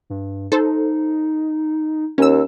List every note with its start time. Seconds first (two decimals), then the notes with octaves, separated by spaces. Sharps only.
0.10 G2
0.52 D#4 A4 C5
2.18 D#2 C#4 E6